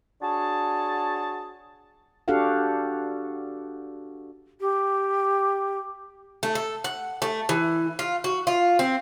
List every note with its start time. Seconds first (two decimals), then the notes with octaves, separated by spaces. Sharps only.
0.22 D4 F#4 G#4 C#5 A5
2.28 D4 F#4 G4 A4 F5 F#5
4.60 G4
6.43 A3
6.55 A4
6.84 F#5
7.22 A3
7.49 E3
7.99 F4
8.24 F#4
8.47 F4
8.79 C4